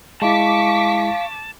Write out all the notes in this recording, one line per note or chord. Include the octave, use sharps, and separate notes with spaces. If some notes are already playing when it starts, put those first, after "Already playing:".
G#3 E4 F5 A5 C#6 D6 B6